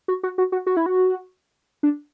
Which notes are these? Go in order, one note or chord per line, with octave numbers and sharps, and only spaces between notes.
F#4
F#4
F#4
F#4
F#4
E4
F#4
D4